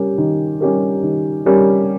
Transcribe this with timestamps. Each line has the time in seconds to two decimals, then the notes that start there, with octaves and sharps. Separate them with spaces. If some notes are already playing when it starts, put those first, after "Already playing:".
Already playing: G3 C#4 G4 A#4
0.18 D#3
0.60 G3 C#4 G4 A#4
1.03 D#3
1.46 G3 C#4 G4 A#4